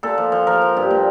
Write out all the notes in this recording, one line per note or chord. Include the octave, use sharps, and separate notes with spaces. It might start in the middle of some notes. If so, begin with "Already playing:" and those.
A#2 A4
F3
F3
F3 A#4
F3
G2
A#2